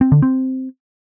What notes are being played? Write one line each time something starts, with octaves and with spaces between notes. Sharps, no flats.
C4
D3
C4